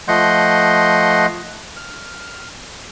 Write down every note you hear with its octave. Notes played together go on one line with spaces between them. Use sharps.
F3 A3 D#5 F#5 C6 G6
F6